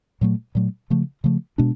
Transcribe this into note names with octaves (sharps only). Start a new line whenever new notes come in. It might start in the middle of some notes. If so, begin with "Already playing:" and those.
A#2 F#3 A3
A#2 F#3 A3
C#3 F3 A3
C#3 F3 A3
B2 G#3 B3 D4